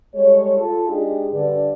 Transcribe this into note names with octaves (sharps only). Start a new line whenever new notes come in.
G3 G#3 A4 C#5
F4 A4
G#3 D4 D#4 G4 G#4
G2 D3 D5